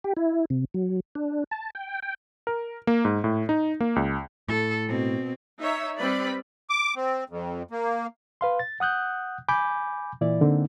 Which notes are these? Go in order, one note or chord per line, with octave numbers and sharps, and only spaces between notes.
G4
E4
C3
F#3
D4
A5
G5
G5
A#4
A#3
G#2
A2
D#4
A#3
C#2
A2 A4
B2 C4
D#4 C#5 E5
G3 C4 B4 D5 B5
D6
C4
F2
A#3
B4 F5 C6
A6
F#5 D#6 F#6 G6
G#5 B5 D6 G6
A#2 E3 E4 D5
D3 A#3 C4 D#4